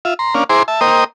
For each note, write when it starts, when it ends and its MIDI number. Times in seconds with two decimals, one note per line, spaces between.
0.05 0.14 65
0.05 0.14 76
0.19 0.34 82
0.19 0.34 84
0.35 0.44 58
0.35 0.44 61
0.35 0.44 62
0.35 0.44 77
0.50 0.63 64
0.50 0.63 68
0.50 0.63 72
0.50 0.63 82
0.50 0.63 84
0.50 0.63 86
0.68 0.80 76
0.68 0.80 81
0.81 1.04 58
0.81 1.04 70
0.81 1.04 72
0.81 1.04 75
0.81 1.04 79
0.81 1.04 87